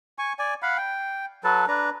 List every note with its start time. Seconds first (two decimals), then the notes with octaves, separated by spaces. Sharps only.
0.18 G#5 C#6
0.39 D5 G#5
0.62 F5 F#5 B5
0.78 G5
1.44 F#3 A4 B4 A5
1.68 D4 B4 A#5